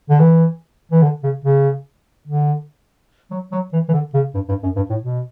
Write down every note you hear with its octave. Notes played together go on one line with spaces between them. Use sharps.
D3
E3
E3
D3
C#3
C#3
D3
F#3
F#3
E3
E3
D3
C#3
G2
G2
F#2
G2
A2
B2